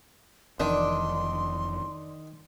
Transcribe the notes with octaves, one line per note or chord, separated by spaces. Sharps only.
F1 F2 D#3 E3 D4 C6